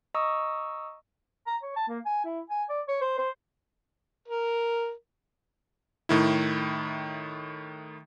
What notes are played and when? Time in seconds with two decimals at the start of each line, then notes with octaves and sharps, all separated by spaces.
0.14 D#5 A#5 C#6 D#6 E6
1.47 A#5
1.63 C#5
1.76 A5
1.88 A#3
2.06 G#5
2.25 E4
2.50 G#5
2.69 D5
2.88 C#5
3.02 C5
3.18 C5
4.28 A#4
6.09 A2 D#3 E4